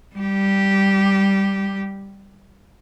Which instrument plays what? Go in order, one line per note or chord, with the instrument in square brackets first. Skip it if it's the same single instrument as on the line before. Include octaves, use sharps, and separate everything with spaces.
[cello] G3 G4